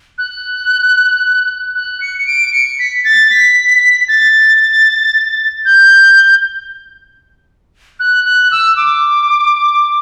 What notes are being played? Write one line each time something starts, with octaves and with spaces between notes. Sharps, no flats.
F#6
F#6
C#7
C#7
D7
C#7
B6
A6
B6
A6
G6
F#6
F#6
E6
D6